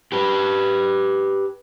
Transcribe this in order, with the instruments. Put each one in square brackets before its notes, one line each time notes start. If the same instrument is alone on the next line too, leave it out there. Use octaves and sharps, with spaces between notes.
[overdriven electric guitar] G4 B4